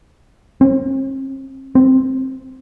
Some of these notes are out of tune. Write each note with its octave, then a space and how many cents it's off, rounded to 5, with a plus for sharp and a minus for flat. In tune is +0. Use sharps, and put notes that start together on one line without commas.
C4 +45
C4 +5